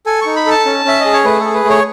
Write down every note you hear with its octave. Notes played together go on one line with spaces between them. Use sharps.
A4 G#5
D#4 C#6
B5
A4 A5
C#4
C#4 E5
D#5
G#4
C#5
A3 B4
G#4 A4
B4
A3
C#5